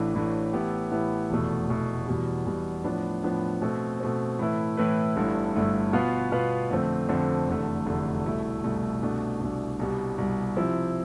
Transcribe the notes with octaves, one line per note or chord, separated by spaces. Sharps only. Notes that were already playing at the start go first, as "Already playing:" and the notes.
Already playing: A1 A2 E3 A3 D4
A1 A2 E3 A3 D4
A2 E3 B3 E4 G4
A2 E3 B3 E4 G4
F1 E2 B2 A3
F1 E2 B2 A3
E2 B2 G3
E2 B2 G3
A2 F3 B3 D4
A2 F3 B3 D4
B2 A3 C4
B2 A3 C4
A2 E3 A3 E4 B4
A2 E3 A3 E4 B4
G1 G2 D3 A3 E4
G1 G2 D3 A3 E4
B2 B3 F4 B4 F5
B2 B3 F4 B4 F5
F2 D3 A3 C4
F2 D3 A3 C4
F1 E2 D3 A3
F1 E2 D3 A3
C2 B2 A3 E4
C2 B2 A3 E4
C2 B2 A3 D4
C2 B2 A3 D4
C2 B2 G3
C2 B2 G3
C3 F3 C4 E4